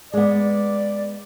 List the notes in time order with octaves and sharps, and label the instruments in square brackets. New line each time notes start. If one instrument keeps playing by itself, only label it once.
[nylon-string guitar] G#3 B3 [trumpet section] D5